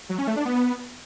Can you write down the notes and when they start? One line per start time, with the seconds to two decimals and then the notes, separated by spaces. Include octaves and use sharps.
0.09 F#3
0.18 C#4
0.27 A3
0.36 D4
0.45 B3